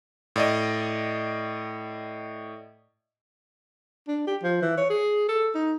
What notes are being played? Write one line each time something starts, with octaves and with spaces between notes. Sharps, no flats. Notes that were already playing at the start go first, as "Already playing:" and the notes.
A2 D5 D#5
D4
G4
F3
E3
C#5
G#4
A4
D#4